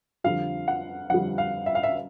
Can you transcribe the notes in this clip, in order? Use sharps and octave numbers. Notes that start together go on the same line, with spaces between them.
F2 D3 G3 F5
F#5
F2 D3 G3 F#5
F5
E5
F5
E5